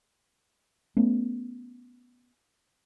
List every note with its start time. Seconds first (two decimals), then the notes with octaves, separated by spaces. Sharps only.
0.97 A3 B3 C#4